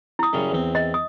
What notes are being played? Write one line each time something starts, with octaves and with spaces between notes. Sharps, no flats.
E4 D#6
F#2 C#3 G3
E2 C4
D#5
D#6